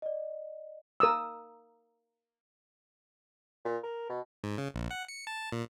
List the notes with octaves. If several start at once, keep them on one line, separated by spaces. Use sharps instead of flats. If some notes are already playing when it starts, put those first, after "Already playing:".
D5 D#5
A#4 D#6 E6
A#2
A#4
B2
G#2
C#3
A#1
F#5
C#7
A5
A#2